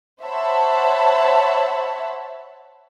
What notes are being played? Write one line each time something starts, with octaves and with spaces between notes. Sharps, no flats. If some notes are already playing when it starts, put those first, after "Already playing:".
C5 C#5 E5 F#5 A5 B5